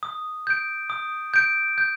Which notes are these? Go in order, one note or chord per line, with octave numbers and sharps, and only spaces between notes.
D#6
G6 D7
D#6
G6 D7
G6